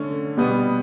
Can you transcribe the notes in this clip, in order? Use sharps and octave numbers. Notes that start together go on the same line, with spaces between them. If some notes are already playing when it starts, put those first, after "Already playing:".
Already playing: D3 A3 C#4
B2 G3 B3